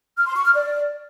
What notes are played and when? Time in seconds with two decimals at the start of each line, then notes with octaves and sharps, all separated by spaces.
0.18 F6
0.27 C6
0.36 C#6
0.45 F6
0.54 D5